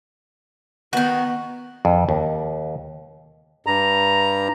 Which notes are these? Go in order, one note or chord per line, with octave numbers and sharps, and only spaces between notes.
D#3 B3 F#4
F2
D#2
G2 A#5